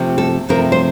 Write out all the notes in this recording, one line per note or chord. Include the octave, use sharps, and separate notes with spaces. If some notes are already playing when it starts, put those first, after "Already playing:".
Already playing: C3 F3 A3 C4
A4
C3 F3 A3 C4 A#4
C5